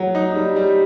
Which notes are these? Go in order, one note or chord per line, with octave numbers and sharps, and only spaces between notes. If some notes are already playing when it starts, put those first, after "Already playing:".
Already playing: F#3
D#4
G3
G3